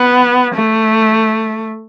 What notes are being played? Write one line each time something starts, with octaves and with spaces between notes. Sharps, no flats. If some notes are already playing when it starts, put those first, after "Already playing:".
Already playing: B3
A3